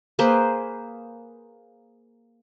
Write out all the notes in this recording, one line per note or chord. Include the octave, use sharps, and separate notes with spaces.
A#3 G#4 B4 C5